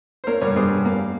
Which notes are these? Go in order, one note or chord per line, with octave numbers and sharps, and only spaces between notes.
C5
A#3 A#4 C#5
G2 A#4 C#5
G2 G#4 C5
G2
A#3